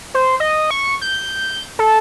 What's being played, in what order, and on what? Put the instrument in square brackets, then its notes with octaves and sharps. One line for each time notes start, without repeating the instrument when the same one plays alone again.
[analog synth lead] C5
D#5
C#6
G6
A4